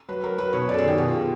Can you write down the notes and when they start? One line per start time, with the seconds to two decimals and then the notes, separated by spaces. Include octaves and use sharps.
0.09 F#3 B4
0.24 F#3 A#4
0.38 F#3 B4
0.53 B2 C#5
0.68 F#2 D5
0.74 A4
0.78 G#4
0.83 D#3 G4
0.98 B2 G4
1.08 F4